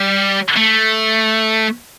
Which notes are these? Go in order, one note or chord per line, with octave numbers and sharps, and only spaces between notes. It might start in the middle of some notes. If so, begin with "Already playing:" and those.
Already playing: G3
A3